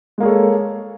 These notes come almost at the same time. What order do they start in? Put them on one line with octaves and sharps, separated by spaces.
G#3 A#3 G#4 C#5 A4